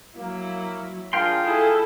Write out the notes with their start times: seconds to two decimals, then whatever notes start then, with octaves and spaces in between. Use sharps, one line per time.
0.15 F#3 A#3 E4
1.13 D4 F4 G#4 A#4 F5 G5 C6
1.44 E4 G#4 A4